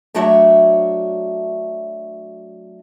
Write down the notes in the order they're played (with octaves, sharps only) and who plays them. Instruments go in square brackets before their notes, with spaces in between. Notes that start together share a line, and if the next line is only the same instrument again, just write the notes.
[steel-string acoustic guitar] F#3 A3 D4 F#4 C#5 E5